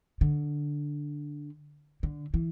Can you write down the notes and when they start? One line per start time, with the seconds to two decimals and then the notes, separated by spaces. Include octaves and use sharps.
0.21 D3
2.03 D3
2.34 E3